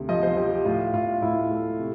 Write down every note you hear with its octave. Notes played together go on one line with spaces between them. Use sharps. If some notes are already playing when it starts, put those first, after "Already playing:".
Already playing: D2 C3
F3 D#5
C5
F3 G4
G4
A2 F4
A2 F4
A2 E4
A3
C3